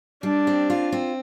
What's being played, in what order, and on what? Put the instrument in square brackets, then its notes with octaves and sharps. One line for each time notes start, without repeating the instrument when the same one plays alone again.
[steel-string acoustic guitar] G3 [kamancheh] D4
[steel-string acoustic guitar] C4
F4
C4